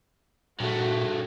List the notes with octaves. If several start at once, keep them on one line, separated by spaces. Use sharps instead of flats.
G2 A#2 A3 F#4